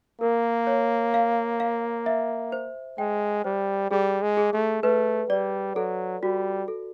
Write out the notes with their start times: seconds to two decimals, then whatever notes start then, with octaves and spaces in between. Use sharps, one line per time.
0.21 A#3 A#4
0.67 C#5
1.14 F5
1.60 F5
2.06 E5
2.52 C5
2.98 G#3 G5
3.44 G3 C5
3.91 G3 G#4
4.22 G#3
4.37 G#4
4.53 A3
4.83 A3 B4
5.30 G3 D5
5.75 F#3 A4
6.23 G3 F#4
6.68 A4